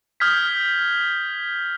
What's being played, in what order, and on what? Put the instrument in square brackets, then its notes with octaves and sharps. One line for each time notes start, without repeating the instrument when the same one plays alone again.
[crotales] D#6 F6 G6 G#6 B6